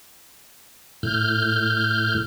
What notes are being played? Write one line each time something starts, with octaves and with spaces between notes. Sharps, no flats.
A2 F6 G6